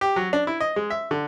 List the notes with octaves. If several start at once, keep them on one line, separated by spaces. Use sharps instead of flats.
G4
F#3
D4
E4
D#5
G#3
E5
D3